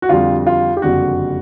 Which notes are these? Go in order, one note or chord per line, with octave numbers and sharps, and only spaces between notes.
F#4
F2 D3 G3 F4
F4
G4
F#1 F2 D3 G3 F#4